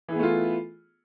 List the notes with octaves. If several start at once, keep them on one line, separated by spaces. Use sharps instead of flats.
E3 A3 B3 F4 G#4